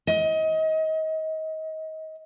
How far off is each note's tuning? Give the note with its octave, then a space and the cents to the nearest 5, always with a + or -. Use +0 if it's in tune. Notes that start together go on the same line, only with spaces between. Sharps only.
D#5 +25